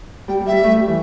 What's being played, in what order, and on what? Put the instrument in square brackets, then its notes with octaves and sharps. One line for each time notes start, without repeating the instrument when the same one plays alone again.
[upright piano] G3 [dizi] G5
[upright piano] G3
[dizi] E5
[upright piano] G3
A3
G3
E3